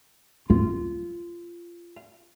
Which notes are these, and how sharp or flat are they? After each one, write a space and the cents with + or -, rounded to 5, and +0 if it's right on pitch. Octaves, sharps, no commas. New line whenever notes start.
F4 -20